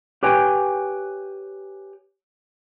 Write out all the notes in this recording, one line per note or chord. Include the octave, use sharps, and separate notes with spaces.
G4 B4 C#5 G5 G#5